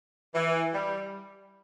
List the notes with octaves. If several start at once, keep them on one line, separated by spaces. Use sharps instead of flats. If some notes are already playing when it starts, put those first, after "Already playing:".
E3
G3